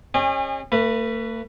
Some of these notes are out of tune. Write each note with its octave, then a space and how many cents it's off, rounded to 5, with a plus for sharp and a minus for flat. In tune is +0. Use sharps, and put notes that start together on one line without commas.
C#4 -30 G#4 -45 D#5 -35
A3 +45 B4 +0